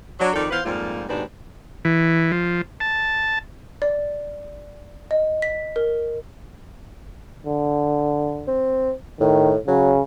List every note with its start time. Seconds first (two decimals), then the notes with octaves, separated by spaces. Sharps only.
0.20 F#3 D4
0.34 F2 D#3 A4 D5
0.51 E3 B3 B4 C5 F5
0.64 F2 G#2 F3 G3 A#3 F4
1.08 D#2 G#2 B2 C4 D4 B4
1.85 E3
2.32 F3
2.80 A5
3.82 D5
5.11 D#5
5.42 B6
5.76 A#4
7.46 D3
8.47 C4
9.20 A2 D#3
9.68 C#3 F#3